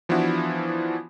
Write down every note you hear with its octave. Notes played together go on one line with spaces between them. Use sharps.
E3 F3 B3 D4 E4 F#4